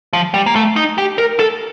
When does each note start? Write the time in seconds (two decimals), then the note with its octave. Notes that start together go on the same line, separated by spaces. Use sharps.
0.13 F3
0.34 G3
0.46 A#3
0.55 A3
0.76 D#4
0.98 G4
1.18 A#4
1.39 A4